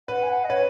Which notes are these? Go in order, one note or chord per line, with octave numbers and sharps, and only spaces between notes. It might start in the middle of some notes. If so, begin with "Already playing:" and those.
B4 F#5
G#5
F#5
D#5
B4 C#5